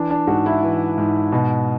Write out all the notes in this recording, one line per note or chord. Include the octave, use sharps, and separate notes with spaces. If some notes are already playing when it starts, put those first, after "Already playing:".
Already playing: E3 D4
D4
G#2 F#4
E4
E3
G#2
B2